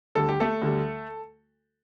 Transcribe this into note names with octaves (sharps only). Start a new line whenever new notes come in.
D2 D3 G3 A4
G4
A3 A4
D2 D3 G3